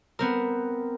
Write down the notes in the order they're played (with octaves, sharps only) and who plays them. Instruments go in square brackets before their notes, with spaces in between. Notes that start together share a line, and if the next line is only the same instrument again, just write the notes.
[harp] B3 C4 A#4